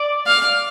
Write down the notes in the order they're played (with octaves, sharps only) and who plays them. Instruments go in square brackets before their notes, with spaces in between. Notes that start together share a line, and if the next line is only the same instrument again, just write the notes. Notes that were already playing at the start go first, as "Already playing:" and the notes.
Already playing: [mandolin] D5
[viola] F5